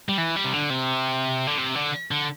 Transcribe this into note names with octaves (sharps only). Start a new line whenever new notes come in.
G3
E3
G3
C3
D3
C3
D3
C3
D3
D3